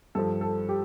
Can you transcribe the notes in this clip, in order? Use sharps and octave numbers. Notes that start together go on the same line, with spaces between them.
G2 F3 A4
A4
G4